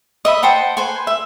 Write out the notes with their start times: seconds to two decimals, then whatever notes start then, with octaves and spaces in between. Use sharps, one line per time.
0.25 D#5 E5 B5
0.43 C5 F#5 G5 A5
0.77 B4 C5 G#5
1.07 E5